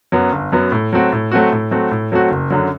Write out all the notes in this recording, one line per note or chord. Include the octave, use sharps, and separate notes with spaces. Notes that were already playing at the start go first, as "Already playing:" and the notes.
F#2 F#3 B3
G1
F#2 F#3 B3
A2
F#3 A3 C4 F#4
A2
F#3 A3 C4 F#4
A2
F#3 A3 C4 F#4
A2
F#3 A3 C4 F#4
F#1
F#2 D3 F#3